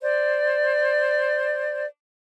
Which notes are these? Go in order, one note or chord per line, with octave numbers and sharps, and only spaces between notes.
C5 D5